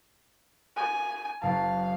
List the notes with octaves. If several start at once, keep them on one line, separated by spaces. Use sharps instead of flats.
G#5
F#1 F5 A5